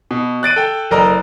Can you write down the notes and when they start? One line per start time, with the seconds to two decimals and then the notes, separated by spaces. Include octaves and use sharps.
0.11 B2
0.43 F#6 A6 D7 D#7
0.56 A4 G5
0.91 F#1 A4 A#4 D5 D#5 A#5